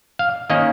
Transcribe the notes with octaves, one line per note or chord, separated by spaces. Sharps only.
F5
D#3 A#3 C#4 D#5